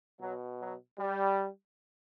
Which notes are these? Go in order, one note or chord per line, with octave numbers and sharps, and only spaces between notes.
B2 F#3
F#3
G3